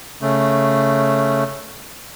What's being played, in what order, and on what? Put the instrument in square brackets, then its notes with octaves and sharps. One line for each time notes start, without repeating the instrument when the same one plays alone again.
[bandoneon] C#3 A3